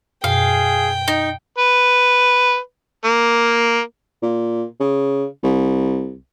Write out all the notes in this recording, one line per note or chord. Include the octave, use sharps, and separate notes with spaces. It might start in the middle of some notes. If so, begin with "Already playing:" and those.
F#2 B2 G#4 F5 G5
D#4
B4
A#3
A#2
C#3
C2